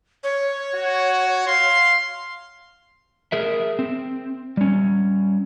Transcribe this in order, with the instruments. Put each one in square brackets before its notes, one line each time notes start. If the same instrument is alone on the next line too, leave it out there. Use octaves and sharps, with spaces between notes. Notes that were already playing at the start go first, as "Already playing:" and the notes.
[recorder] C#5
[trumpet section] F#4
F5 C6
[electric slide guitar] G#4 A#4 E5
C4
G3 C#4